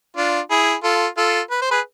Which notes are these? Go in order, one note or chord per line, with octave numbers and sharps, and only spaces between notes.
D4 F4
E4 G#4
F4 A4
F4 A4
B4
C5
G#4 B4